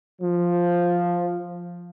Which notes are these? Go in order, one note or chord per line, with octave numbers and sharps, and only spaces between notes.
F3